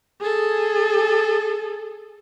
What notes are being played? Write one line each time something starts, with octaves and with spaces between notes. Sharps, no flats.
G#4 A4